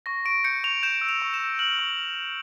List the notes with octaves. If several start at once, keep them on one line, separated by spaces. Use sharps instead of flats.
C#6 A#6
C#6 D7
G6 C#7
C#6 F7
G6 E7
E6
F7
C#6
E7
E6
F6 F#7
C#6
F6
F6